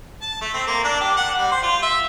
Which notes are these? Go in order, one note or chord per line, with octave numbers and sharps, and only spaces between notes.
A5
A3
C4
A#3
D4
G4
F#5
G3
C5
F4
E5